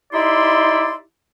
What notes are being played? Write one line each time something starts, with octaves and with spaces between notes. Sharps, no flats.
D#4 E4 G4 D5 E5 C6